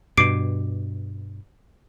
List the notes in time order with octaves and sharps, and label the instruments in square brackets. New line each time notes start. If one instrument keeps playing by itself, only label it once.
[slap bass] G2 B2 [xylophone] D6 C7 D7